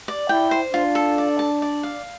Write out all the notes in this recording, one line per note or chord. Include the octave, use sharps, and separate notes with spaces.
D5
E4 G5
C5
D4 F4
A4
D5
A5
D5
F5